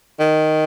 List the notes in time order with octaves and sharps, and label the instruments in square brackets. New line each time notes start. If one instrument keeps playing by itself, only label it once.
[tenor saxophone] D#3